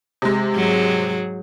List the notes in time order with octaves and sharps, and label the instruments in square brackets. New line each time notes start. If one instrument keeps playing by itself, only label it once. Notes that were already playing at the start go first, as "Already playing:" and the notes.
[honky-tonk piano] C3 G#3
[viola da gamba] G#2 F#3 G#4